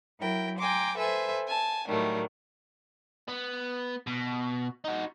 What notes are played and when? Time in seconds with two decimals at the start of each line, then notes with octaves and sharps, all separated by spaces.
0.20 F#3 E4 A#4 G5
0.58 G5 G#5 A#5 C6 D6
0.97 A4 B4 C5 E5 G#5
1.48 G#5 A5
1.87 A2 D#3 F#3 G3 A3
3.29 B3
4.07 B2
4.84 D#4 F#4